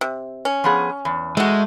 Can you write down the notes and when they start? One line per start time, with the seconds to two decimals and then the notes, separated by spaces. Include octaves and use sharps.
0.01 C3
0.45 C#4
0.64 F3 B3 G#4
1.05 E2
1.37 G#3 A3 F#4